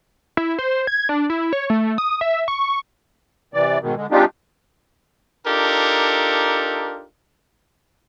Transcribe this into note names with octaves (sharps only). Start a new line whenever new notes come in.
E4
C5
G#6
D4
E4
C#5
A3
D#6
E5
C#6
C3 E3 D5
G#2 B2 D#3
D3 G#3
G#3 C4 D4 D#4 F4 G4
D4 D#4 F4 G4 A4 A#4